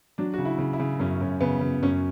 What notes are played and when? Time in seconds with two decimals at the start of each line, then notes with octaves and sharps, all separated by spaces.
0.18 F#3 D4
0.34 C#3 F#4
0.45 E4
0.58 C#3
0.73 E4
0.80 C#3
1.00 F#2 C#4
1.21 F#2
1.41 C#3 B3
1.61 C#3
1.83 F#2 C#4